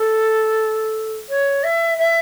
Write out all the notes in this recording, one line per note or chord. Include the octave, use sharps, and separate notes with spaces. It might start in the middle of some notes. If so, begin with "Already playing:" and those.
Already playing: A4
C#5
E5
E5